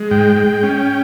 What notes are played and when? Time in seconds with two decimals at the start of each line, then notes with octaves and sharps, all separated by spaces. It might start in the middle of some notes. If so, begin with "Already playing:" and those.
Already playing: G#3
0.11 G#2 G5
0.36 G#3
0.63 C#4